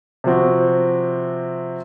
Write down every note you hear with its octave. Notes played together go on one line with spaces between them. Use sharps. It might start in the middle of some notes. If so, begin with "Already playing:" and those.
C3 F3 C4 F#4